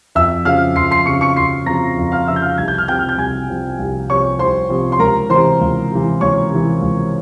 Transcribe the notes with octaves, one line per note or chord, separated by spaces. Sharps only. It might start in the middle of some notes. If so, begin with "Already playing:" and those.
F2 E5 E6
C#3 F3 C4 F5 F6
F2 C6 C7
C6 C7
C#3 F3 C4 C#6 C#7
C#6 C#7
F2 C6 C7
C#3 F3 C4 A#5 A#6
F2
F5 F6
C#3 F3 C4 E5 E6
G6
F5 F6
C2 G#6
G6
F6
C3 F3 C4 G5 G6
F6
G6
C2 G#5 G#6
C3 F3 C4
C2
C3 F3 C4 C#5 C#6
C2 C5 C6
C3 F3 C4
C6
C#2 A#4 A#5
C3 E3 C5 C6
C#2
C3 E3
C#2 C#5 C#6
C3 E3
C#2